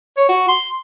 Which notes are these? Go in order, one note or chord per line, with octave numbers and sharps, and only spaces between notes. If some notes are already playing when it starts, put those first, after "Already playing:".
C#5
F#4
C6